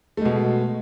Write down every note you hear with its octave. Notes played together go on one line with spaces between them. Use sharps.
B2 G#3 A3